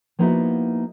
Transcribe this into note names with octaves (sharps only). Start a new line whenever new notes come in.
F3 A#3 B3 D#4 E4 F#4